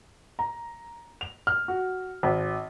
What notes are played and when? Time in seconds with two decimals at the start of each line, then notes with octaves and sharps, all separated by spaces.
0.39 A#5
1.21 F7
1.47 F6
1.68 F#4
2.23 G#1